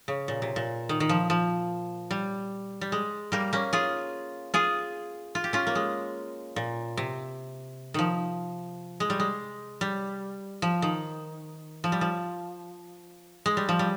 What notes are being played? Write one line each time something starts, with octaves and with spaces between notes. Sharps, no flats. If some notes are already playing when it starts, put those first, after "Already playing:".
C#3
A#2
C3
A#2
D#3
D#3
F3
F3
G3
G3
G#3
G3 A#3
A#3 C#4
F4 G#4
F4 G#4
F4
G4
C#4 F4
A#3
G#3
A#2
C3
D#3 F3
G#3
G3
G#3
G3
F3
D#3
F3
G3
F3
G#3
G3
F3
G3